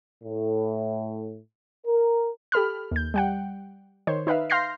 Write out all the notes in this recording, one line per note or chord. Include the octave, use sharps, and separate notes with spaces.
A2
A#4
G4 A4 B5 F6
D#2 G6
G3 F#5 G5
D#3 C5 C#5
D#4 B4 E5 F5
F5 C6 F6 G6 A#6 C7